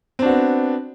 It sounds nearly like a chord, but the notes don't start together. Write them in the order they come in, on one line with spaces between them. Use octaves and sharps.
C4 D4 F#4 B3